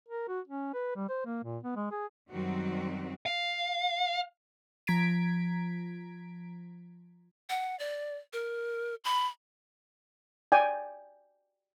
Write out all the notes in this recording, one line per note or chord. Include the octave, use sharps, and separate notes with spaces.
A#4
F#4
C#4
B4
G3
C5
A#3
A#2
B3
G#3
G#4
F#2 D#3 F#3 G3 C4 F#4
F5
F3 A#5 G#6 B6 D7
F#5
D5
A#4
B5
D5 G5 G#5